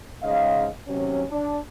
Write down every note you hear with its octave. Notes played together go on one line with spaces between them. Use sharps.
G#2 C#3 D#5 F5
D#2 C3 F#3 C#4
D4